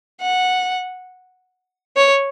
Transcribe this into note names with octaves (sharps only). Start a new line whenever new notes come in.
F#5
C#5